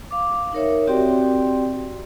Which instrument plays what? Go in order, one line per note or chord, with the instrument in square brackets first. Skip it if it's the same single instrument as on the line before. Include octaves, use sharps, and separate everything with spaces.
[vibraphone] F5 D6
D#4 A#4 C#5 E5
C4 F#4 G4 D5 G5 C6